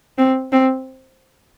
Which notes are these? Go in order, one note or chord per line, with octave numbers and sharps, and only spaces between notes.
C4
C4